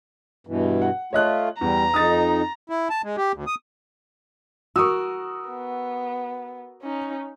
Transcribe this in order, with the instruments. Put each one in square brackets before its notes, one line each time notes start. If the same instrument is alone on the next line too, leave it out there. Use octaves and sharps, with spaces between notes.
[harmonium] G2 B2 E3
[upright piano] F#5
[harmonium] A3 F4 [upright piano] C#5 D#5 F#6
[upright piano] E2 [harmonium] G3 [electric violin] A#5
[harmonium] F2 D#4 [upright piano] D#6 A6
[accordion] E4
A5
G#3
G4
D2
D#6
[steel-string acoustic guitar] F#4 A#4 [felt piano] C#6 D#6 E6
[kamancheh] B3
C#4 D#4